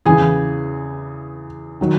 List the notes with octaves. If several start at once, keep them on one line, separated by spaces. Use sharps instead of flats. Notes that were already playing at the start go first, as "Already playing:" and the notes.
E2 C#3 E3 G#4 G#5
D#3 F#3